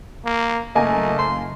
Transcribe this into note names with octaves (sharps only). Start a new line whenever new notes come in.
A#3
F#1 A3 A#3 D#5 G#5
C6